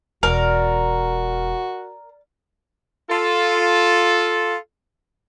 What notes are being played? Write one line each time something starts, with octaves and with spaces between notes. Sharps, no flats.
E1 F#4 A#4 D5
F4 A4